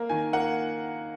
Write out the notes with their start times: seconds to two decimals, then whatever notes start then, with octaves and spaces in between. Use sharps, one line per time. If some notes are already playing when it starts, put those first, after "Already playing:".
Already playing: A#3
0.09 D#3 G#5
0.33 A#3 F#5